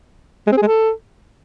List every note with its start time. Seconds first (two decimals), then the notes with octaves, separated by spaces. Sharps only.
0.47 G#3
0.52 C4
0.57 G#4
0.62 G#3
0.67 A4